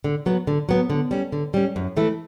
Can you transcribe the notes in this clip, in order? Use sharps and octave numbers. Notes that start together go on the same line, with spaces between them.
D3
F#3 B3
D3
F#3 B3
D3
G3 C#4
D3
G3 C#4
F#2
E3 A3 E4